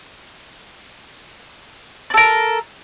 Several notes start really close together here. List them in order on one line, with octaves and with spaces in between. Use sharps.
D5 A4 A#4